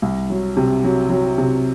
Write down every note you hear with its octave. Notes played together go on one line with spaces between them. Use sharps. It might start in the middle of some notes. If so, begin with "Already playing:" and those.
C2
F#3
C3
F#3
F#3
C3